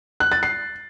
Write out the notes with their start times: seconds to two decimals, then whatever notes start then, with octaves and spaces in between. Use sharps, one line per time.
0.20 F#6
0.32 A6
0.43 C7